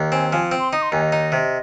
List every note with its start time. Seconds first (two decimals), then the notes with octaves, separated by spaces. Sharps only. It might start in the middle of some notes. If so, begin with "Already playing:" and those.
Already playing: D#2
0.12 C4 G#5
0.32 F3 G#5
0.52 C4
0.59 C6
0.73 D#4 D#6
0.82 C6
0.92 D#2 G#5
1.02 D#5
1.12 D#4
1.32 C3